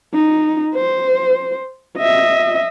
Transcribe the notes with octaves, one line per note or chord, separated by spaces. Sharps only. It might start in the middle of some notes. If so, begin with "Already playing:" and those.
D#4
C5
D#5 E5